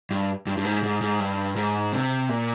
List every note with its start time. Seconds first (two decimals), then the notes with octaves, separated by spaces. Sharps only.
0.11 G2
0.47 G2
0.57 G2
0.65 G#2
0.83 G#2
1.01 G#2
1.20 G2
1.56 G#2
1.92 C3
2.29 A#2